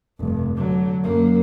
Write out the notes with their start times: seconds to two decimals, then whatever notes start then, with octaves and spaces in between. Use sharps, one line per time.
0.19 F1 G2
0.55 D3 F#3
1.04 F#2 A#3